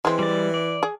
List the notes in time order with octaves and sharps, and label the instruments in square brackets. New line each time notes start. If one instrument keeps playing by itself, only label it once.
[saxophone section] E3 [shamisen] G#3 C4
[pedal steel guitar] G3 D5
D5
[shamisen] G#4